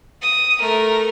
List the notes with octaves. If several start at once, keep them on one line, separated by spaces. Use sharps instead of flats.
D#6
A3 A#4